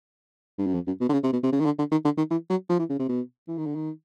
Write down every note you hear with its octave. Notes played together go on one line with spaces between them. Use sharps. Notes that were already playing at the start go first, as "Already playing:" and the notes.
G2
F#2
F2
F#2
B2
D3
C#3
C3
B2
C3
C#3
D#3
D3
D3
D#3
D3
D#3
E3
F#3
F3
E3
C#3
C3
B2
E3
D#3
D3
D#3